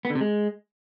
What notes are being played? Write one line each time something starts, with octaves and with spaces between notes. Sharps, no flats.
B3
D3
C3
G#3